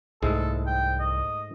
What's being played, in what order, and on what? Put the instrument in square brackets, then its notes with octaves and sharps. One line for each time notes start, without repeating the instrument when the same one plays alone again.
[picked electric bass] C2 [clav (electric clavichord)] G#2 G#3 A3 [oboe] A4
[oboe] G5
D#5